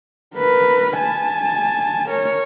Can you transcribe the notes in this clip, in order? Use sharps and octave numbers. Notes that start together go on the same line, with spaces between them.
A#4 B4
G#5 A5
A#4 C#5